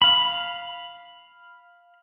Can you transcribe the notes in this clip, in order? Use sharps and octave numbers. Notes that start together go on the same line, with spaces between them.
F5 B5